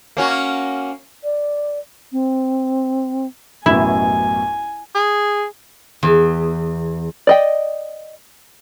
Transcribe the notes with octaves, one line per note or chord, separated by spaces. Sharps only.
A#3 C#4 F#4
D5
C4
A1 F#2 B2 E4 G#5
G#4
E2
D5 D#5 G5